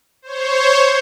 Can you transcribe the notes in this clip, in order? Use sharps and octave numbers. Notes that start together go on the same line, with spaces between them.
C5 C#5